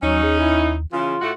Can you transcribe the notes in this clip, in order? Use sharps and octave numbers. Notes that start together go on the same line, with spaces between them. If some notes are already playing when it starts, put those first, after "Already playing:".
D#2 F#3 C#4 D#4
G#4
E4
C#3 E3 F4
A2 A3 F#4